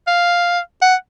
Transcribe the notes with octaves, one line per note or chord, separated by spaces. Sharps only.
F5
F#5